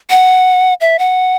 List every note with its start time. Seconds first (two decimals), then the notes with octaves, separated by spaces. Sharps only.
0.10 F#5
0.81 E5
0.99 F#5